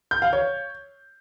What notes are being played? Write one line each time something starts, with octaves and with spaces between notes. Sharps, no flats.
G6
F5
C#5